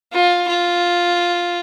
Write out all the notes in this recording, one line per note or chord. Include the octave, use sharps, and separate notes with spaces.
F4
F4